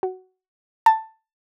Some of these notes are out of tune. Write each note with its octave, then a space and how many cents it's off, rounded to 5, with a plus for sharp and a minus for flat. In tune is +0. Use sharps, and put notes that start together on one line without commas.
F#4 +10
A5 +10